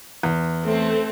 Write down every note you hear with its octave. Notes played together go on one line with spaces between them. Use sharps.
E2
A3 C4